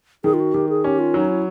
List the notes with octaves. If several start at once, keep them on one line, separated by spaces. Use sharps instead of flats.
D#3 G#4
F4
F#4
D#3 G4
G#4
C#4 G4
F4
F#3 D#4
E4